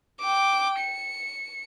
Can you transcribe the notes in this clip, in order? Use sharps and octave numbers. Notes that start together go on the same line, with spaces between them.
G5 D6
C#7